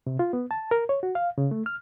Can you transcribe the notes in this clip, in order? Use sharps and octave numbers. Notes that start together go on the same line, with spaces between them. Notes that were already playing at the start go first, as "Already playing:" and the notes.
C3
F4
B3
A5
A#4
C#5
F#4
F5
C#3
A3
F6